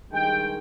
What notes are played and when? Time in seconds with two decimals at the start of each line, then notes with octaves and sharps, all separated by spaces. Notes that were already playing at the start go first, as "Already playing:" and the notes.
0.12 G2 D#3 G#3 G5